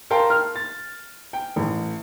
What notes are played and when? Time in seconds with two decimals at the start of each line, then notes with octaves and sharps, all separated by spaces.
0.10 A#4 F5 G5 A5 C6
0.30 F6
0.56 A6
1.33 G5
1.56 A1